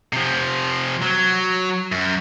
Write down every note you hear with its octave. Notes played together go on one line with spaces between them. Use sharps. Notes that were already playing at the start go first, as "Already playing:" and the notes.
C3 F3
F#3
F#2